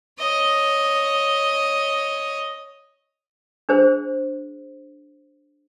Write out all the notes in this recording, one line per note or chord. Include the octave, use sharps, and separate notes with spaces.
C#5 D#5
D4 G#4 C5